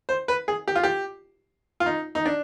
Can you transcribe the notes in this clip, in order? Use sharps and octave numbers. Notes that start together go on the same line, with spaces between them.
C5
B4
G#4
G4
F4
G4
F4
D#4
D#4
D4